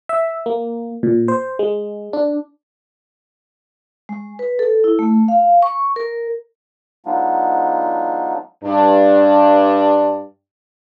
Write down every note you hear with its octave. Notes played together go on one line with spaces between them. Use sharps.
E5
A#3
A#2
C5
G#3
D4
G#3
B4
A4
E4
A3
F5
C#6
A#4
F#3 G#3 B3 D4 D#4 F4
G2 D4